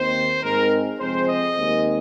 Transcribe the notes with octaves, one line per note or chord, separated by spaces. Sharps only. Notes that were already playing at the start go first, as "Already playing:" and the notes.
Already playing: D#2 D#3 C4 C5
G#2 G#3 C4 A#4
F2 C3 G#3 C4 C5
D#5
D#2 D#3 G#3 C4